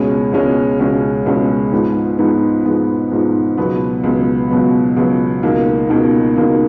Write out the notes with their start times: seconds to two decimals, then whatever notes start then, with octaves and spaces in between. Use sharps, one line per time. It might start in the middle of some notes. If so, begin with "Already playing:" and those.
Already playing: C#2 B2 G#3 C#4
0.33 C#2 B2 G#3 C#4
0.79 C#2 B2 G#3 C#4
1.26 C#2 B2 G#3 C#4
1.72 G#2 F3 B3 D#4
2.18 G#2 F3 B3 D#4
2.65 G#2 F3 B3 D#4
3.12 G#2 F3 B3 D#4
3.57 C#2 B2 F#3 B3
4.04 C#2 B2 F#3 B3
4.51 C#2 B2 F#3 B3
4.97 C#2 B2 F#3 B3
5.43 C#2 B2 A#3 D#4
5.89 C#2 B2 A#3 D#4
6.36 C#2 B2 A#3 D#4